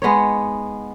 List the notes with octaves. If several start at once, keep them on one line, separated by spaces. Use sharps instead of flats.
G#3 B3 D#4 C#5